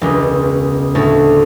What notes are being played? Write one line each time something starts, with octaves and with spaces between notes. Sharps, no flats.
E1 C#2
D2 A2 A5